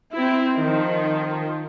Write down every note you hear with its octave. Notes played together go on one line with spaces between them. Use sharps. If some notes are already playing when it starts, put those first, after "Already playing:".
C4 E4
D#3 F3